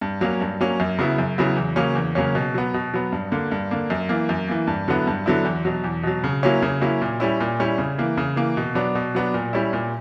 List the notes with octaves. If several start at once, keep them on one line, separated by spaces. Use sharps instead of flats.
G2
F#3 A#3 C#4
G2
F#3 A#3 C#4
F#2
C#3 F#3 B3 E4
F#2
C#3 F#3 B3 E4
E2
C#3 F#3 A#3 C#4
E2
C#3 F#3 A#3 C#4
B2
F#3 B3
B2
F#3 B3
G2
D3 A#3
G2
D3 A#3
F#2
E3 A#3
F#2
E3 A#3
G2
D3 F#3 B3 E4
G2
D3 F#3 B3 E4
E2
B2 F#3
E2
B2 F#3
C#3
F#3 A#3 C#4 E4
C#3
F#3 A#3 C#4 E4
A#2
G3 C#4 E4
A#2
G3 C#4 E4
C#3
E3 A#3
C#3
E3 A#3
B2
F#3 B3 D4
B2
F#3 B3 D4
A#2
G3 C#4 E4
A#2